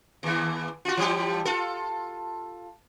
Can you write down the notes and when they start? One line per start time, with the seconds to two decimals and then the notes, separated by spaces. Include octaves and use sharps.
0.23 D#2 E3
0.85 F4 F#4
0.97 E3 G3 G4
1.45 F4 A4